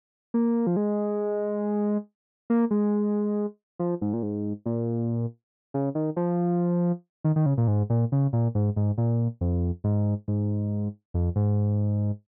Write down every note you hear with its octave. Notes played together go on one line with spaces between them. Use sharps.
A#3
F3
G#3
A#3
G#3
F3
G#2
A#2
G#2
A#2
C#3
D#3
F3
D#3
D#3
C#3
A#2
G#2
A#2
C#3
A#2
G#2
G#2
A#2
F2
G#2
G#2
F2
G#2